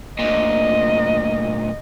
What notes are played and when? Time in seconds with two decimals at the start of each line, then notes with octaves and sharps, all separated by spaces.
0.19 D2 A#2 D#5